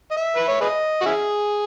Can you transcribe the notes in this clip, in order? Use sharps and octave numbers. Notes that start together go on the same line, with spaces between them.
D#5
E5
B4
C#5
G#4 B4 D#5
F#4
C#4 E4 G#4